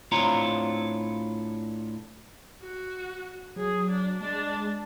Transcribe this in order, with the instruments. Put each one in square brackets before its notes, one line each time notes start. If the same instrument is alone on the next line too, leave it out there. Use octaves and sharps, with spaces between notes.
[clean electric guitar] A2 C4 D4 F4 C#5 A#5
[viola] F#4
[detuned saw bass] F#3 [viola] G#4
[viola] D4
[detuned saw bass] G#3 [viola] D4 A5